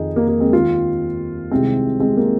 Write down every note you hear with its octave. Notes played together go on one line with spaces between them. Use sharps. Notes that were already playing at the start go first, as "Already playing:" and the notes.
Already playing: F2 D#3 D#4 G#4
A#3
A#3
G#3 C4
D#2 D#3 C4 F4
C2 C3 D#3 G#3 C4
G#3 C4
A#3